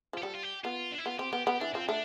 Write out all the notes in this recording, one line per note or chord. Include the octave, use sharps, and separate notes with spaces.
F3 G4
G3 A4
F4
G4
B3 F4
D4
E4
B3 F4
C4 G4
B3 G4
B3 G4
E3 D4
F3 C4
A3 D4